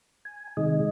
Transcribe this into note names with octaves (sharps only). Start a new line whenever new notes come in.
G#5
C3 D#3 G#3 D#5